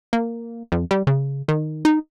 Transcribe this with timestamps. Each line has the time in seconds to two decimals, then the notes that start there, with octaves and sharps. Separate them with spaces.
0.13 A#3
0.72 F2
0.91 G3
1.07 C#3
1.48 D#3
1.85 D#4